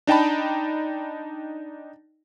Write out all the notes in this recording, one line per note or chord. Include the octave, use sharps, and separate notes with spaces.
D4 D#4 G5 A5 B5